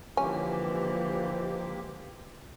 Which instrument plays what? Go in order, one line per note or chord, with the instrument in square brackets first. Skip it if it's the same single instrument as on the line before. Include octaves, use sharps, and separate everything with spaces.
[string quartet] D3 E3 [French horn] F3 [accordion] G#3 A#3 G4 [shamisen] C#4